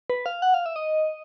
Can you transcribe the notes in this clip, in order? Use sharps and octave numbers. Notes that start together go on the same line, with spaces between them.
B4
F5
F#5
F5
E5
D#5